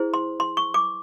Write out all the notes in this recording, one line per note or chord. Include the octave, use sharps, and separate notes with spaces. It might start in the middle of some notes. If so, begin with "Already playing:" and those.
Already playing: E4 G#4 C5
C6
C6
C#6
D6